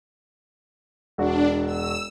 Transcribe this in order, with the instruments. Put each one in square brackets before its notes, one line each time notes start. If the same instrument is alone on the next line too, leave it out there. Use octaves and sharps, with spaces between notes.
[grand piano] E1 F#4 [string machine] D4
[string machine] E6